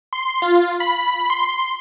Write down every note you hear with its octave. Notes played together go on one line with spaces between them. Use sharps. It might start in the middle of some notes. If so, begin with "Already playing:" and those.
C6
F4
B5
C6